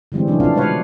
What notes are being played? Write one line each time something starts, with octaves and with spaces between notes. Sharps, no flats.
D3 E3 G3 G#3 C4
C3 E3 F#3 A3 C#4 D4
B2 F3 C4 D4 F4 F5
B2 G3 G#3 B4 C#5 F5